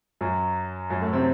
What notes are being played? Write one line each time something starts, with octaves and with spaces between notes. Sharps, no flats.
F#2 F#3
F#2 F#3
A2 A3
C3 C4